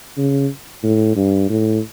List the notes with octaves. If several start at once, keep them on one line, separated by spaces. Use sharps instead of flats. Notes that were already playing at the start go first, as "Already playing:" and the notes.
C#3
A2
G2
A2